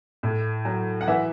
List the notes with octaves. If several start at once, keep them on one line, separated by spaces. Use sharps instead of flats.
A2
F#3
F#5
E3 E5